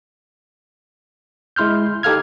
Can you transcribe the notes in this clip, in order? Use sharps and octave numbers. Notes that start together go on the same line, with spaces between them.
G#3 E4 C6 F6 G6
D#4 G4 A4 F5 F6 G#6